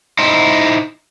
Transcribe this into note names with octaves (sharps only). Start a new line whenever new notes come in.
D#4 E4 C5